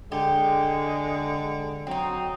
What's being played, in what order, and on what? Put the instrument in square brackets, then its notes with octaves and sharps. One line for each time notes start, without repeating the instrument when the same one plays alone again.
[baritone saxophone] D3 [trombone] G#3 [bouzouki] G4
[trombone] F#3 [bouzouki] C4 D#4